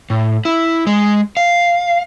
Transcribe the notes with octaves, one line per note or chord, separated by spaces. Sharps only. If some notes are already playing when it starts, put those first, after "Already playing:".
A2
E4
G#3
F5